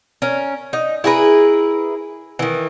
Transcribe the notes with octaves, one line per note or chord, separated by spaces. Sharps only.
C#4 A#4
D#4
E4 G#4 A#4 B4
D#3 E3